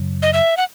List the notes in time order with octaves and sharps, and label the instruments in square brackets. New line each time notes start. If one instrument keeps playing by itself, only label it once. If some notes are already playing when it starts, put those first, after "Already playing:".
Already playing: [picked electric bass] F#2 C#3 F#3
[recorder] D#5
E5
F#5